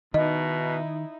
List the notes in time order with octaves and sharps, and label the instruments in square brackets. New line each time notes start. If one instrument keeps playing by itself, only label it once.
[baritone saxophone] B2 [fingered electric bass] D#3 [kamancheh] D#4 E4 [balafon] D#5